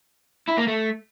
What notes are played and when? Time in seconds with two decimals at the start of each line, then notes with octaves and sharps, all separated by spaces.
0.48 E4
0.58 A#3
0.68 A3